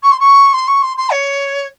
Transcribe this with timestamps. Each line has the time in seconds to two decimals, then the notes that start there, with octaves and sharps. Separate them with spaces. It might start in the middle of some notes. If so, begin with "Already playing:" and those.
0.03 C#6
0.11 C6
0.19 C#6
0.53 C6
0.67 C#6
0.82 C6
0.97 C6
1.11 C#5